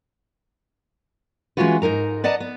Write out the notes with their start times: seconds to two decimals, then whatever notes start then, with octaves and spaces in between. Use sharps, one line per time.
1.57 E3 G#3 C#4 F4 F#4 B4
1.82 G#2 D#4 A#4 A#5
2.24 B4 D5 D#5 F#5 A5 A#5
2.40 B3